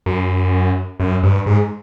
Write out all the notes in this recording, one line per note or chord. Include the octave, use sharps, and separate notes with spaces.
F#2
F#2
G2
G#2